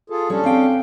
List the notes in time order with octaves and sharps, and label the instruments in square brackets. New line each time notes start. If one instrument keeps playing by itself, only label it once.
[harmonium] F4 G#4 A4
[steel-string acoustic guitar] G3 C#5 [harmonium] C#4 D4 A4
[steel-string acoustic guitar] C4 F5 G5